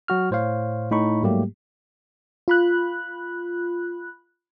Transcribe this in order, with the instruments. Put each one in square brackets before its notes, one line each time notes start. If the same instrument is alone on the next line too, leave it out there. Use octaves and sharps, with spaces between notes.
[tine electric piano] F#3 F#4 F6
A2 C5 C#5 F5
A2 D#4 B5 C#6
G#2 F#3 G3 A3 A#3 G4
[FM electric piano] F4 B5 F#6